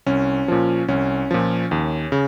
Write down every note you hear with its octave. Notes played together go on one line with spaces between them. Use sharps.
C2 C#4
A#2 F3
C2 C#4
A#2 F3
D#2
C#3